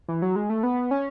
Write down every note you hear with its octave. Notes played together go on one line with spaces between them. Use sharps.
E3
F#3
G#3
A3
B3
C#4